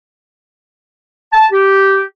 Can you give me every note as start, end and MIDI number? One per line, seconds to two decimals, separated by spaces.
1.32 1.45 81
1.52 2.01 67